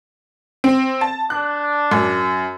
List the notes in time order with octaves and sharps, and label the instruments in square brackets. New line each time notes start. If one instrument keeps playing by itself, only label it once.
[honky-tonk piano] C4
A5
[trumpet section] D4 [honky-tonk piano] F#6
[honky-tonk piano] F#2